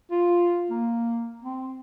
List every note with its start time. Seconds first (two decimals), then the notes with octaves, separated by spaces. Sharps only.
0.11 F4
0.70 A#3
1.43 C4